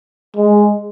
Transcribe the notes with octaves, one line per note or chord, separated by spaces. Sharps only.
G#3